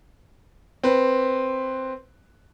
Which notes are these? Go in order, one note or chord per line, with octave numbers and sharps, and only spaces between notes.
C4 B4